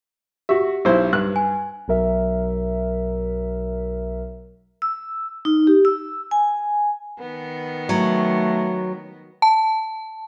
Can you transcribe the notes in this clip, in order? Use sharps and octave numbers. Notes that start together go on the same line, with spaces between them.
F#4 G4 E5
B1 E4 C5
G2 F#6
G#5
B1 F#3 A#4 E5
E6
D#4
G4
E6
G#5
D#3 B3
F#3 A3
A5